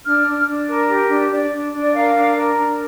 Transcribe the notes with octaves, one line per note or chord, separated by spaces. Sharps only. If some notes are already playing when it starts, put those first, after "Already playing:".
D4 F6
D4
D4
A#4
G4
D4
D4 D5
D4
D4
D5
A#4 F5
D4
A#4
D4